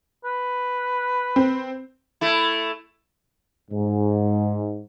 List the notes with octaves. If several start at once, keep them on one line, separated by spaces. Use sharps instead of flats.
B4
C4
A3 E4
G#2